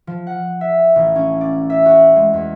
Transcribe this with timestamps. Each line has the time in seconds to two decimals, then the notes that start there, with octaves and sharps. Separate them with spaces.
0.07 F3
0.27 F#5
0.61 E5
0.96 A1
1.16 C#4
1.41 D5
1.70 E5
1.86 F#4
2.16 G#3
2.33 E2